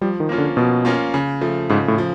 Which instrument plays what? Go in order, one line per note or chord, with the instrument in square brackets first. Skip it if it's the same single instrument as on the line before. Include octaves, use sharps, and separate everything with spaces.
[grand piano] F3 [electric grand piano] G3
[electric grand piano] D#3
[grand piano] A#3 C#4 F4
[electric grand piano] D3
[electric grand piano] B2 [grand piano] F3
[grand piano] A#3 C#4 F4
C#3
F3 A3
[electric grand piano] G#2 [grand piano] C#3
[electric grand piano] A2
[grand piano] F3